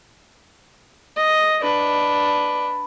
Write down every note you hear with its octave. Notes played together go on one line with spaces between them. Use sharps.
D#5
D4 B4